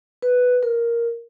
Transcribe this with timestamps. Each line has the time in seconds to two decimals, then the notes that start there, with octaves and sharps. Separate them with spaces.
0.22 B4
0.63 A#4